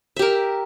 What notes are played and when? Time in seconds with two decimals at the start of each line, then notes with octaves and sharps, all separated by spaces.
0.16 E5
0.19 G4
0.22 A#4